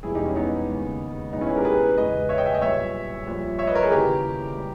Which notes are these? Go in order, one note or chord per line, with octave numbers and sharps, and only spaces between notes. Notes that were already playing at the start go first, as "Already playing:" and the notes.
E1 E2 B2 G3 E4 G#4
D#4 G4
C#4 E4
B3 D#4
D#2 C#3 G#3
B1 A#2 G#3 B3 D#4
C#4 E4
G#4 B4
G4 A#4
G#4 B4
E2 C#3 G#3 B4 D#5
C#5 E5
D#5 G5
E5 G#5
D#5 G5
B1 A#2 G3 C#5 E5
A#1 A#2 G3
C#5 E5
B4 D#5
A#4 C#5
G#4 B4
D#2 C#3 E3 G4 A#4
G3